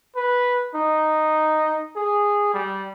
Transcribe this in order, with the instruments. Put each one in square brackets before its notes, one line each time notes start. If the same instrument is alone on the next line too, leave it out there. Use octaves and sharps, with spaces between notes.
[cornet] B4
D#4
G#4
G3